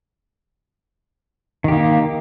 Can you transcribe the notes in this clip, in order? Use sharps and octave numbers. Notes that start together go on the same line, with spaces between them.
D#3 A#3 G4